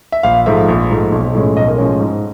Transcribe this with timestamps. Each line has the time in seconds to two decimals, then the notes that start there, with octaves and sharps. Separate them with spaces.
0.12 E5
0.23 A#1 F5
0.46 G#2 F3 A3 E5
0.68 A#1
0.90 G#2 F3 A3
1.12 B1
1.34 A2 F3 G#3 C#4
1.57 B1 D#5
1.68 A#4
1.78 A2 F3 G#3 C#4
2.00 G#2